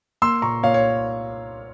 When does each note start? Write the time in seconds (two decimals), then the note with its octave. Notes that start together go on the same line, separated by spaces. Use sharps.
0.22 A#3 C6 E6
0.42 A#2 A#5 C#6
0.63 A#2 C#5 F5
0.74 C#5